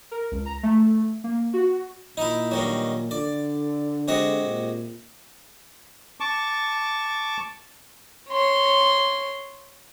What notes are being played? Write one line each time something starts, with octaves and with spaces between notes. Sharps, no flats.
A#4
C#2
A#5
A3
A#3
F#4
A#2 D#4 E4
G2 D#3 F#3
D3 D5
C3 G#3 F#4
A#2
A5 C#6 D6
C#5 C6